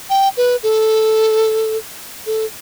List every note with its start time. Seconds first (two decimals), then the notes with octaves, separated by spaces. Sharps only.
0.10 G5
0.37 B4
0.63 A4
2.26 A4